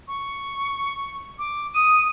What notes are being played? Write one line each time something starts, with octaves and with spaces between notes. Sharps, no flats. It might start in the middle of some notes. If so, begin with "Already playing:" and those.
C#6
D6
D#6 D#7